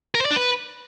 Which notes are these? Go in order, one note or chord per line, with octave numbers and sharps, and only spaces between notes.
A#4
C5
D5
D4
B4